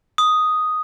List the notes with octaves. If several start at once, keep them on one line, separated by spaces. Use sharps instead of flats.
D#6